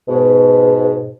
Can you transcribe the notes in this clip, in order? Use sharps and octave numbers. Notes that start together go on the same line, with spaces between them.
G#2 B2